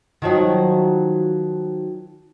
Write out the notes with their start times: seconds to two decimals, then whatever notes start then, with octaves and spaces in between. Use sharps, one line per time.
0.22 D#3 F3 F#3